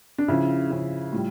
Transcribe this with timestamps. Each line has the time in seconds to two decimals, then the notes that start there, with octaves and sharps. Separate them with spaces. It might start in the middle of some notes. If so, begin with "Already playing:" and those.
0.18 D4
0.28 C#3 F3 E4
0.70 C#3 F3
1.12 A2 G3 F4